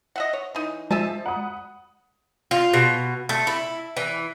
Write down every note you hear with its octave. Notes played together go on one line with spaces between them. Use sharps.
D#5 E5 F#5
C#5
E3 D#4
F3 G#3 E5 G#5 A5
F#5 B5 D#6
F4
B2
A3
E4
E3